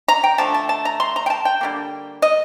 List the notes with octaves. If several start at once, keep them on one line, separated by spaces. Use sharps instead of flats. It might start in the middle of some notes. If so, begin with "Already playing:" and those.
A#5
G5
D3 F3 A3 A5
A5
A5
A#5
C6
A#5
G5
A5
G5
D3 G3 A#3
D#5